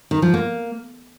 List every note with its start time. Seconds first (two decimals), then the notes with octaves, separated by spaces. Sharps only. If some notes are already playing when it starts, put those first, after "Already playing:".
0.11 D#3
0.22 F3
0.34 A#3